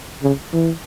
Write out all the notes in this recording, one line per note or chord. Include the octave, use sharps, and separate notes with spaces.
C#3
E3